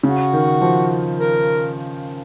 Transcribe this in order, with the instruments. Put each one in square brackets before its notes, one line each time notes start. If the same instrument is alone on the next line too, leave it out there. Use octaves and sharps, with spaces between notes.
[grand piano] C#3 [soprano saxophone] F#4
[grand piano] D#3
F3
[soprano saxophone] A#4